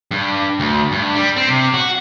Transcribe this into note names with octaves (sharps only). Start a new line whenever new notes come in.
G2
D2
G2
G3
C4
C3
F#4